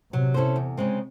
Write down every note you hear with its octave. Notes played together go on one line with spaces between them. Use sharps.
C3 F#3
C#4 E4 A4 C5
E2
C#3 G#3 C4